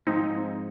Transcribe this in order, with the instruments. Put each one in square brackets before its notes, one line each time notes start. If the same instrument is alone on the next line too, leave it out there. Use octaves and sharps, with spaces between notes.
[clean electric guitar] G#2 F3 G#3 [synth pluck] C4 D#4